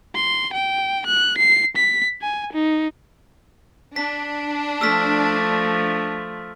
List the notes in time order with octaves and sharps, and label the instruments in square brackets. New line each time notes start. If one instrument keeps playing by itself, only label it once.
[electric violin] C6
G5
F#6
C7
B6
G#5
D#4
[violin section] D4 [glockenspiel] B6
[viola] F3 A3 [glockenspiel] E6 F6 B6